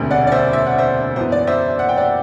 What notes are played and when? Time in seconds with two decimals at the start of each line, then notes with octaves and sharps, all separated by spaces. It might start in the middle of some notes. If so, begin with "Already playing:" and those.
Already playing: E1 D2 C3
0.11 D5 F#5
0.27 D5
0.32 C5 E5
0.53 E5
0.66 F#5
0.78 C5 E5
1.16 F#2 E3 B3 C5
1.32 D5
1.47 C5 E5
1.79 F#5
1.89 G5
1.97 D5 F#5